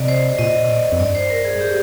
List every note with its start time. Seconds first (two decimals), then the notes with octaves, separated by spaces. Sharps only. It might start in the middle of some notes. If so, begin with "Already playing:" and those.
Already playing: C3 D5 D#5
0.08 C5
0.23 C5
0.39 A#2 D#5
0.69 D5
0.92 F2
0.99 G2 D5
1.15 C5
1.30 A#4
1.45 G#4
1.61 G4